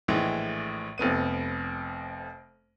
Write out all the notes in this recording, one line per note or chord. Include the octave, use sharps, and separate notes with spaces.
A#1 A2 E3 G#3
F1 F2 B3 D#7